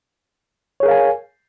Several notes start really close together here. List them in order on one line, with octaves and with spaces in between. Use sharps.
C#5 G#4 A#4 F5 G#5